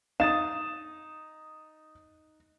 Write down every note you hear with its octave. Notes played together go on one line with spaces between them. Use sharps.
D#4 F5 D#6 A6 E7